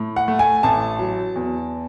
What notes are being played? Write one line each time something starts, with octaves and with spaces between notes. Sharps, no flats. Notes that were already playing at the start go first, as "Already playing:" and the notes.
Already playing: A2
F#5
A3
G#5
A1 A5
F#3
E2